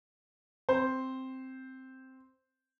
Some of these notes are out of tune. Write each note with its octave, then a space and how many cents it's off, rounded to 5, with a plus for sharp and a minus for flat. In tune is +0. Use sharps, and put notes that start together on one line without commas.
C4 +0 C5 +0